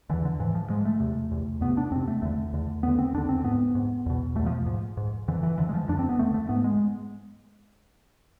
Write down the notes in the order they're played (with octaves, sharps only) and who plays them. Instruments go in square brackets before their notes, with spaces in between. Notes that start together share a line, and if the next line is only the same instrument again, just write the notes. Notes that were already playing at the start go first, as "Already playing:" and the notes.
[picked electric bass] E2 D3 E3
D3
G#2 E3
F3
G#2 G#3
A3
E2 C3
E2 C3
F2 C3 B3
D4
F2 C3 C4
A3
E2 D3 A3
E2 D3
E2 D3 B3
C4
E2 D3 D4
C4
G#2 B3
G#2
E2 B2
E2 B2 A3
F3
G#2
G#2
F2 D3 E3
E3
F2 D3 E3
G#3
F3
F2 D3 D4
C4
B3
F2 D3 A3
A3
G#2 B3
G#3